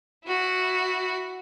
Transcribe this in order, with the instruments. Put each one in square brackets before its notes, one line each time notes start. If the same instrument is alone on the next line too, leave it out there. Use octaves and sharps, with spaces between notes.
[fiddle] E4 F#4